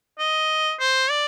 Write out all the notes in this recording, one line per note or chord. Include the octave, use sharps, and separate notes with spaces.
D#5
C5
D5